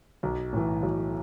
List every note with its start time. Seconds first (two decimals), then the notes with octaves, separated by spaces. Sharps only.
0.23 B1
0.53 A2 E3
0.83 B1